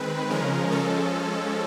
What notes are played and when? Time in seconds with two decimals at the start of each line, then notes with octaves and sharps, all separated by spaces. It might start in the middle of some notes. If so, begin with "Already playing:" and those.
Already playing: D#3 G#3 C4 B4
0.30 C#3 F3 G#3 C#4 A#4
0.71 F3 G#3 C#4 A4